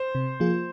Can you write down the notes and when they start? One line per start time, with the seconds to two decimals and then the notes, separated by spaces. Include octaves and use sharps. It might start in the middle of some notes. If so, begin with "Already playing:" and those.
Already playing: C5
0.15 C3
0.40 F3 A#3 F4 G#4